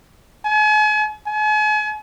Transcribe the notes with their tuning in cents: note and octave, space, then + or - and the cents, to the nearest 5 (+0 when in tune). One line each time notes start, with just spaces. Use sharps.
G#5 +40
G#5 +40